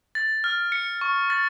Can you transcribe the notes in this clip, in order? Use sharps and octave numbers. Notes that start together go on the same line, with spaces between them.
A6
F6
C#7
C#6
A6